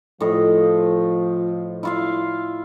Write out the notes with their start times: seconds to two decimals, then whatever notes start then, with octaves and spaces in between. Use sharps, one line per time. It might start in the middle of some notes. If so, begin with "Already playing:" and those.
0.20 A2 F3 D#5
1.83 E4 F4 F5